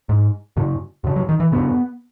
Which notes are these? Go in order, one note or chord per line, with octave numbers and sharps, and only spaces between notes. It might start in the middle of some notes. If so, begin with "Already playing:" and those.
G#2
F#2 C#3
F#2 C#3
F#3
D#3
E3
F#2 C#3 B3